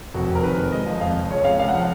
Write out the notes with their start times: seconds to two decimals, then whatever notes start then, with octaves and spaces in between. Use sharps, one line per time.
0.14 F1 F#4
0.29 F1
0.35 A#4
0.43 D#3 B4
0.58 F1
0.72 G#3 D#5
0.86 F3
1.01 F2 F5
1.16 F1
1.30 C#2 C#5
1.44 C#2 F5
1.59 C#2 F5
1.69 F#5
1.74 F3